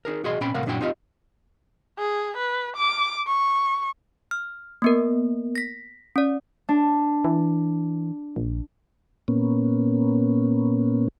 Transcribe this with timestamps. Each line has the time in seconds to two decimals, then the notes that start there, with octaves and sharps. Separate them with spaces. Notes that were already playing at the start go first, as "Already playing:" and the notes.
0.05 D#4 G#4 A#4
0.24 B1 F#4 G#4 D#5 C6
0.41 A#2 C4 C#4 G5 B5
0.54 C2 A2 C3 A#4 F5 F#5
0.66 F#2 A#2 D4 E4 F#4 G5
0.81 C4 D#4 F4 G4 D#5
1.99 G#4
2.37 B4
2.77 D6
3.28 C#6
4.31 F6
4.82 A#3 B3 A#4
5.55 A#6 B6
6.16 C#4 D5
6.69 D4
7.24 E3
8.36 A#1
9.28 A#2 A#3 B3 C#4